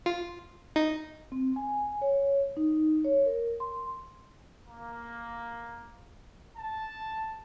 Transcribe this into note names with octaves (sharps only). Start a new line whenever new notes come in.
F4
D#4
C4
G#5
C#5
D#4
C#5
A#4
C6
A#3
A5